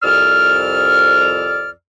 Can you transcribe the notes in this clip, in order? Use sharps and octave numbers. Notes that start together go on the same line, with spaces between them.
C2 F2 D5 E6 F6